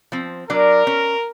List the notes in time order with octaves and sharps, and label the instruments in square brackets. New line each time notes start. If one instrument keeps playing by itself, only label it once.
[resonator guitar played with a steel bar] F3 C4
[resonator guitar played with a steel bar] F#3 D4 D5 [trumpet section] A#4
[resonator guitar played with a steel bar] C#4